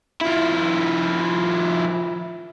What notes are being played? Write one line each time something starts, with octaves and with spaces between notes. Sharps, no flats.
F3 E4